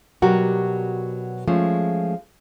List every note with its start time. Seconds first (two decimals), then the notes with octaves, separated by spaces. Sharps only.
0.22 B2 F#3 G3 F#4 G4 A#4
1.48 F3 G#3 A3 C#4